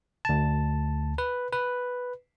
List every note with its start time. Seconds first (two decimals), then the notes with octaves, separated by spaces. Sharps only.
0.25 D2 A5
1.18 B4
1.53 B4